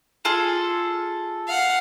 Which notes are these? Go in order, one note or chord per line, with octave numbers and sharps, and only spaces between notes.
F4 G#4 A4
F5 F#5